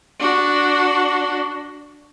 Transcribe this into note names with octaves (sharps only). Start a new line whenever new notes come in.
D4 F#4